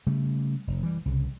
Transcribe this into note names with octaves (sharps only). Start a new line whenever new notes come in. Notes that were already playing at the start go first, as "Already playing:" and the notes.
C#3 G3 A3
F1
E3 G3
C2 C#3